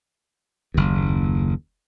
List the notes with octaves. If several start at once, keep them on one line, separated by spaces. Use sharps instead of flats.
F#1 D#2